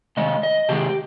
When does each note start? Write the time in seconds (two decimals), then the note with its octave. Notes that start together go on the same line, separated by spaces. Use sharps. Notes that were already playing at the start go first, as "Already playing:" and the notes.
0.17 C3 D#3 G#3 D#5
0.43 D#5
0.69 C3 D#3 G#3 G4